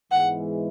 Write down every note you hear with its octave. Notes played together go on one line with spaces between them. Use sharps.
G#2 E3 G#3 B3 E4 F#5